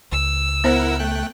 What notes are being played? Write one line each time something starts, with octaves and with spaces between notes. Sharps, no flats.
C#2 E6
B3 E4 A#4 C5 F#5
A3 G5 F#6